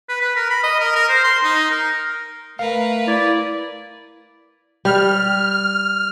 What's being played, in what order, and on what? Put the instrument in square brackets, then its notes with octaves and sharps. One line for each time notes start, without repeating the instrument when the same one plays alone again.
[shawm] B4
B4
A#4
B5
D#5
A#4
A#4
C5
C6
D#4
A#4
[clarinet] A3 [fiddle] A#4 B4 [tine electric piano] F5
[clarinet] E4 [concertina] D5
[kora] G3 [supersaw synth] F6